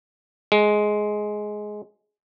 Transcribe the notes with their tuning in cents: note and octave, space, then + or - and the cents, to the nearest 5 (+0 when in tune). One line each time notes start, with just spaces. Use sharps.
G#3 +10